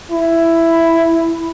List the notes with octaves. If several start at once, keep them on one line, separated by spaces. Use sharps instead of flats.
E4